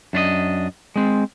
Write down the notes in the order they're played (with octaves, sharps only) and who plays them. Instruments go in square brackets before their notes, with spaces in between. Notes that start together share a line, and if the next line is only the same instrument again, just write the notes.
[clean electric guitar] F#2 D4 F4 D#5
G#3 C4